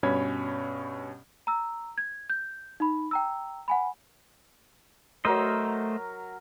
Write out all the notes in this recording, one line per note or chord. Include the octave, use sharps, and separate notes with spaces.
G2 B2 C#4 C#5 B5 G#6
A#5 E6
G#6
G6
D#4 B5
G5 A#5 E6
F#5 G#5 B5
F#3 A3 A#4 C5 D#5 E6